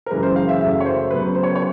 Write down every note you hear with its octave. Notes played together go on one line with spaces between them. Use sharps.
A#4
F#2 C#3 E3 G#3 B4
C5
F5
E5
F#2 C#3 F#3 A3 E5
C#5
C5
C#3 F#3 B3 B4
C5
C#5
C#5